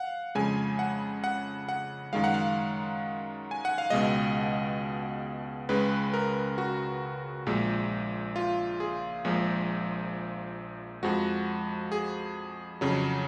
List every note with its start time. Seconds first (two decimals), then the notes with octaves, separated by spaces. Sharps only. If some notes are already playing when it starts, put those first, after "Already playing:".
Already playing: F5 F#5
0.35 F2 C#3 G#3 G#5
0.79 F#5
1.24 F#5
1.69 F#5
2.13 F#2 D#3 G#3 F5
2.24 F#5
2.34 F5
3.51 G#5
3.65 F#5
3.78 F5
3.90 C#2 B2 G#3 D#5
5.69 C#2 C#3 G#3 B4
6.14 A#4
6.58 F#4
7.46 A#1 A#2 G#3
8.36 F4
8.80 G#4
9.25 A#1 A#2 F3 G#3
11.03 F2 F3 G#3 F#4
11.92 G#4
12.81 F2 C#3 F#3